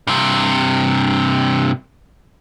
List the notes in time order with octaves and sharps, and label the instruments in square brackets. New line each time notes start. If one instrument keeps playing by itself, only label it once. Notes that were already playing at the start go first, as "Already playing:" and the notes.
[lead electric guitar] G2 C3